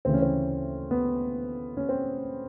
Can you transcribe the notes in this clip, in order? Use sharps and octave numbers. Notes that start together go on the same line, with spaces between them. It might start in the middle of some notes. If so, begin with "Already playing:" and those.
D2 C#3 E3 C4
C#4
C4
B3
C#4
C4